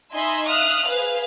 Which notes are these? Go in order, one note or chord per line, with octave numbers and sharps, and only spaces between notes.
D#4 D#5 E5 G#5 B5 C6
E5 F5 D#6 F6 F#6
G#4 B4 C5 F5